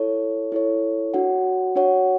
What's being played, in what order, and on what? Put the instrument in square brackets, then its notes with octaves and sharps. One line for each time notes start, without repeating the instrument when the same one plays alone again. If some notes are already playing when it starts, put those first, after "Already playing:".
Already playing: [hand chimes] E4 A4 C#5
E4 A4 C#5
D4 F#4 C#5 F#5
D4 F#4 C#5 F#5